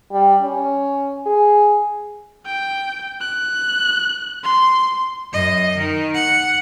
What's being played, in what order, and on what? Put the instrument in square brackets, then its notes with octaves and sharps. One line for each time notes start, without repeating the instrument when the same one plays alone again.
[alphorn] G3
C#4
G#4
[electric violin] G5
F#6
C6
[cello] F#2 D#5
D#3
F#5